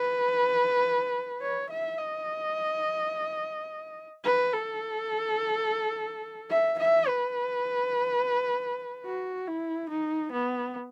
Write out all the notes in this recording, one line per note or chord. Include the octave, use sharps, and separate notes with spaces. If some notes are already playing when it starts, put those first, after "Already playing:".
Already playing: B4
C#5
E5
D#5
B4
A4
E5
E5
B4
F#4
E4
D#4
B3